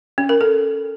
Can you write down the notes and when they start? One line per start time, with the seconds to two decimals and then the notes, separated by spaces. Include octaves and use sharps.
0.18 C#4
0.29 A#4
0.41 A4